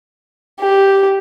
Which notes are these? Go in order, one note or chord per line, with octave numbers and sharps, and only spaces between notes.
G4